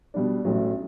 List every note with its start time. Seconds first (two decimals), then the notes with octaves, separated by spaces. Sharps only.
0.14 B2 G3 D4
0.45 A1 A2 F#3